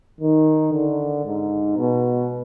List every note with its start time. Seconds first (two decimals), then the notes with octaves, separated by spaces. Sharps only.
0.20 D#3
0.73 D3
1.25 G#2
1.77 B2